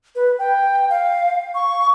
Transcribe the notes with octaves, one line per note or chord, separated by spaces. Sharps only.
B4
G5
F5
C#6